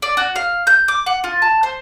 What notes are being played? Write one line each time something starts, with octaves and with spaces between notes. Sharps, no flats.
D5
F#4
F5
G6
D6
F#5
F4
A5
C5